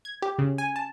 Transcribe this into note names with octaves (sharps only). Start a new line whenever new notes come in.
G#6
G4
C#3
G#5
A5